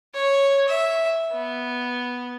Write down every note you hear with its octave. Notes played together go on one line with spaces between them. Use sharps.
C#5
E5
B3